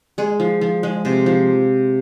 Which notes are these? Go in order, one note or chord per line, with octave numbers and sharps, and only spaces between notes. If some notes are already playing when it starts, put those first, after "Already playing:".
G#3 G#4
F3
F3
G#3
C3
F3